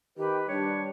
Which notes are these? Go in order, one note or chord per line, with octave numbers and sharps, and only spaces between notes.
D#3 G4 B4
G3 D4 C#5